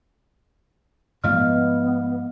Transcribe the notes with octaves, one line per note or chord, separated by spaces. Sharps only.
G#2 F3 A3 B3 D#5 F5 F6